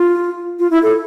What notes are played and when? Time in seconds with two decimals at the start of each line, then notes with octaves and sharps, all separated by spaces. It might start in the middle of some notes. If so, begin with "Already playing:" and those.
Already playing: F4
0.59 F4
0.71 E4
0.83 A4